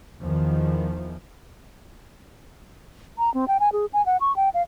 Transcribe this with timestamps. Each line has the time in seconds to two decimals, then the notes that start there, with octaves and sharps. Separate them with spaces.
0.22 E2 D#3 F3
3.18 A#5
3.34 C4
3.48 G5
3.60 G#5
3.72 G#4
3.93 G#5
4.06 F#5
4.21 C#6
4.36 G5
4.54 F5